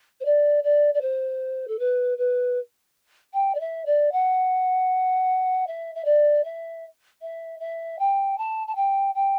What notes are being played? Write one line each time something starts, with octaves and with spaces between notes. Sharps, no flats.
C5
D5
D5
D5
C5
A4
B4
B4
G5
D5
E5
D5
F#5
E5
E5
D5
E5
E5
E5
G5
A5
A5
G5
G5